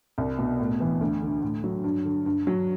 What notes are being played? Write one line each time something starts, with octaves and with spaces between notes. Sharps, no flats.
C2
B2
A2
E3
D2
D3
A2
F#3
G2
D3
G2
F#3